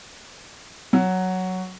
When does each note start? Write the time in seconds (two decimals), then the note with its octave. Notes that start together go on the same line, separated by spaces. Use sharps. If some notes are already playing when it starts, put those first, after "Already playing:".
0.93 F#3